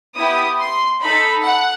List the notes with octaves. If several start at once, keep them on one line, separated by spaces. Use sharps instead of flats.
B3 E4 G4 D#6
C6
D#4 A4 B5
F#5